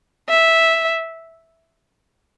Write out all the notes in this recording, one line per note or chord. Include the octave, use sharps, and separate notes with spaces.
E5